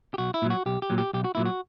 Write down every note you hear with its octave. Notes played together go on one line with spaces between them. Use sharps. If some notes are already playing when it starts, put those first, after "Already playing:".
G4
B1 F#4
E4
A#2 F#3
F#4
B1 G4
G4
A#2 F#3
G4
B1 G4
F#4
A#2 F#3 E4
F#4